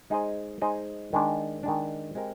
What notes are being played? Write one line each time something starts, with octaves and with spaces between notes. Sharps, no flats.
G#3 D#4 G#4 C5 D#5
G#3 D#4 G#4 C5 D#5
D#3 G#3 D4
D#3 G#3 D4
G#3 C4 G4 A#4